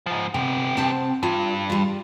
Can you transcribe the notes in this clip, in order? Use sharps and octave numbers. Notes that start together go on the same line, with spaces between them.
G#2 F3
C3 B3 G4
C3 C4 A5
G2 F4
G3 F4